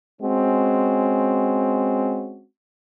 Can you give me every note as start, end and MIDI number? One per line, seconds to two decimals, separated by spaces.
0.21 2.44 56
0.21 2.44 60
0.21 2.44 61
0.21 2.44 66